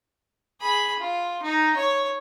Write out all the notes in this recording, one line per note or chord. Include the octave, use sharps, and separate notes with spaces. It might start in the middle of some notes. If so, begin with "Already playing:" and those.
G#4 B5
F4
D#4
C#5